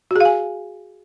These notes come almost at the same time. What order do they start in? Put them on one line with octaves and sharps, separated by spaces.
F#4 G#4 F5 G#5